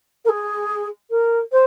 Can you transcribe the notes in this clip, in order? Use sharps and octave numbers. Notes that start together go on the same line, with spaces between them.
A#4
G#4
A#4
C5